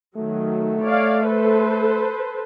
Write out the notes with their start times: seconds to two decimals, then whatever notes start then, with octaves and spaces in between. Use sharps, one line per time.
0.16 D#3 F#3 A3
0.83 C#5 D5 F5
1.25 A4 B4 C5